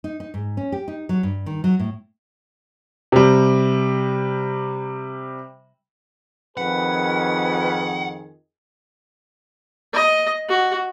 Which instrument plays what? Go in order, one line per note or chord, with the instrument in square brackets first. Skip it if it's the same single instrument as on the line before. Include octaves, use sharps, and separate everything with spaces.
[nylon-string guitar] D#4
D#4
G#2
C#4
G4
D#4
F#3
G2
D#3
F#3
A2
[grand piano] C3 G3
[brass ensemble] F2 D#3 G#4 [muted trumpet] B4 [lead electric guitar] F#5
[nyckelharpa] D#5
F#4